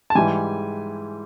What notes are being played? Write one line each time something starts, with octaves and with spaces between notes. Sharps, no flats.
A5
G#2 E3 G3 G#5